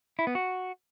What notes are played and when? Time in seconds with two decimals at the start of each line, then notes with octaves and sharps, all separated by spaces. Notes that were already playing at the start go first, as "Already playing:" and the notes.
0.19 E4
0.27 B3
0.35 F#4